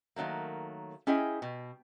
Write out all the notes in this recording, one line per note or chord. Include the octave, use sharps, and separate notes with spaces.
D#3 F#3 A3 A#3
C#4 E4 G#4 D#5 G5
B2